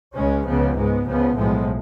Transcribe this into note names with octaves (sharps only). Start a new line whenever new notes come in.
C#2 C#3 G#3 C#4
C#2 C#3 F3 B3
G#2 G#3 B3
C#2 C#3 F3 B3
B1 A2 F3 G#3 B3